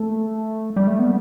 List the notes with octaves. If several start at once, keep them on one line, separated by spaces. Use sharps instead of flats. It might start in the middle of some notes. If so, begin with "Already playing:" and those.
Already playing: A3
G3
A3
B3